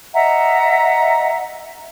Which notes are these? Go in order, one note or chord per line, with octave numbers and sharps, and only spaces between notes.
D#5 E5 F#5 A#5